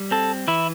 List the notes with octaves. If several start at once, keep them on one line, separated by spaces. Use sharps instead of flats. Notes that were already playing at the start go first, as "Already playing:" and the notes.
Already playing: G3
C4 A4
E3 E4